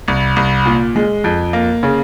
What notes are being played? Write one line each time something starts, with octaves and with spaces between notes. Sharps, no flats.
C2
C2
A#2
G#3
F2
A#3
C#3